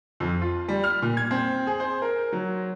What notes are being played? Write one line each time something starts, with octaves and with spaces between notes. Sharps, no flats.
F2
F4
G3
F6
A#2
G#6
C4
G#4
C5
A#4
F#3